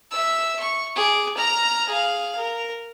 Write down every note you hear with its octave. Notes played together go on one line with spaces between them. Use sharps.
E5 E6
C#6
G#4 D6
A#5 F6
G#4 F5
A#4